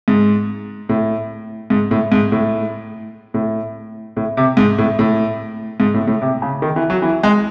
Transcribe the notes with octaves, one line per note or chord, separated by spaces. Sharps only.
G#2
A2
G#2
A2
G#2
A2
A2
A2
C3
G#2
A2
A2
G#2
A2
A2
C3
C#3
D#3
E3
F#3
E3
G#3